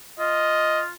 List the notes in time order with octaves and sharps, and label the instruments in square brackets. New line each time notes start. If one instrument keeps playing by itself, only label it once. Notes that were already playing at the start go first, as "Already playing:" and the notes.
[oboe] F4 [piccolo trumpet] D#5